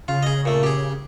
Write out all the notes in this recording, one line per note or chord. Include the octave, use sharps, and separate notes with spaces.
C#3 F4
G#4 D#5
A#2 A3
G4 G#4